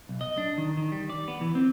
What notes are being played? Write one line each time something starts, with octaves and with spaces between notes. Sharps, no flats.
B1
D#5
D4
D#3
D#3
G3
D5
B3
E3
C4